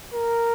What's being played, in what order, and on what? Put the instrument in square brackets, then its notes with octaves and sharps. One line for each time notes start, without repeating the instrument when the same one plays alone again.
[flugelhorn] A#4